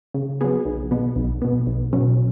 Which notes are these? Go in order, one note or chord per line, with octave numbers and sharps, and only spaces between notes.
C#3
F#3 B3 G#4
B1
B2 B3
B1
B2 B3
B1
B2 F#3 C#4